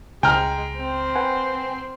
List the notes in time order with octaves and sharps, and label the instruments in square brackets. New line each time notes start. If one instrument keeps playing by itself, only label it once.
[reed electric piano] C#2 [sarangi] G#3 [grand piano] G5 A#5 F6
[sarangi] C4
[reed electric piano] B4 F#5 G#5